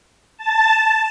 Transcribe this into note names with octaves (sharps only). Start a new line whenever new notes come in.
A5